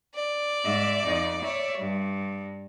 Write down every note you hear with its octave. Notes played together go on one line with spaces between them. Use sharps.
D5
G#2 E5
F2 D#4
C#5 E5
G2